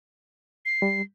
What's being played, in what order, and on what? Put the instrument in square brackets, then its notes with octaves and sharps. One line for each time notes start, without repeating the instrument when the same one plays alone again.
[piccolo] C7
[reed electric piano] G3